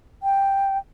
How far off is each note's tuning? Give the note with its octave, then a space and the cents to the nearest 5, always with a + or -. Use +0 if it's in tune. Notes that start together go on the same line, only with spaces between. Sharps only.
G5 +5